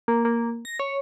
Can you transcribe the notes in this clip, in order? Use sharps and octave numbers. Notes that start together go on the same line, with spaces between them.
A#3
A#3
A#6
C#5